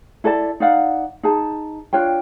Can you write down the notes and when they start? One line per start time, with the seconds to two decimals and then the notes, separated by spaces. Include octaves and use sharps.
0.24 E4 A4 D5 A5
0.60 D#4 D5 F5 F#5
1.23 D#4 G#4 A5
1.93 D4 F4 C#5 G5